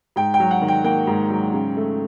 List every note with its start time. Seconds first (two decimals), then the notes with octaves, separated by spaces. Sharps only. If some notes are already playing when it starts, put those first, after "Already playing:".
0.16 G#2 G5
0.34 G5
0.40 F#3
0.51 F#5
0.61 D#3
0.68 G5
0.84 A#3 G5
1.07 G#2
1.30 F#3
1.53 C#3
1.77 A3